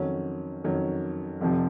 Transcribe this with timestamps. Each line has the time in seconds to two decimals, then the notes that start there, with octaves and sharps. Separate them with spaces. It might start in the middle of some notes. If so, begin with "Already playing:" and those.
Already playing: F2 D#3 F#3 C#4
0.64 F2 D#3 F#3 C#4
1.41 F1 F2 C3 F3